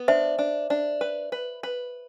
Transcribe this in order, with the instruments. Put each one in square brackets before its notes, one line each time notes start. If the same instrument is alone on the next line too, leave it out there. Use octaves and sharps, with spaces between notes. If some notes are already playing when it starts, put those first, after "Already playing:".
Already playing: [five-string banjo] B3
[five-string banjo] D4 [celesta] C5 E5
[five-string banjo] D4
D4
B4
B4
B4